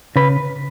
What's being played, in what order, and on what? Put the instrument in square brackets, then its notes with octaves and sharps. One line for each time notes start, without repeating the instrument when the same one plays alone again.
[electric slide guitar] C#3 B4